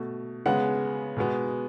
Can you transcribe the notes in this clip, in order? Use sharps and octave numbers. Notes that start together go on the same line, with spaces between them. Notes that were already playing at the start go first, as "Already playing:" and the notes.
Already playing: B2 A3
C#3 G#3 B3 F#5
B2 G#3 B3